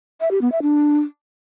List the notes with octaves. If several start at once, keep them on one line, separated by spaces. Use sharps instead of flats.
E5
G4
B3
E5
D4